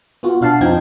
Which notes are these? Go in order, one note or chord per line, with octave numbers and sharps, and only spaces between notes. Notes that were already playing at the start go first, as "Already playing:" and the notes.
B3 F4 F#4
B2 D4 F5 F#5 A5 C7
F2 F3 C4 D#4 G5 G#6